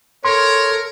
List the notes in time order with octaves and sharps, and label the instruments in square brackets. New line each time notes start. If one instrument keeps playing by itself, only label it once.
[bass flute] A4 [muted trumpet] A#4 [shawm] C#5 [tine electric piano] C6